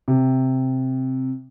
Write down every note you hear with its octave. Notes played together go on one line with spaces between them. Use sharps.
C3